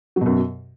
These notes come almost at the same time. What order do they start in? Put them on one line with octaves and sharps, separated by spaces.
F#3 B2 F#2